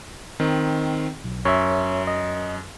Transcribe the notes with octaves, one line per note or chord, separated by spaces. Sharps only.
D#3 C4
B1
F#2 C#5 E5
D#5